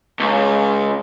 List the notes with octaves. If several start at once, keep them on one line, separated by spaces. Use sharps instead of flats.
C#2 F5